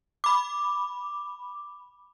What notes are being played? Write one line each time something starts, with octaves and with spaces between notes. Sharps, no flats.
B5 D6